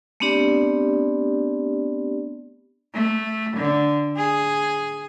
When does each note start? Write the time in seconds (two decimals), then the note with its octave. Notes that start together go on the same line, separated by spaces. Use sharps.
0.20 A3 B3 C4 D4 G4 D5
2.94 A3
3.57 D3
4.17 G#4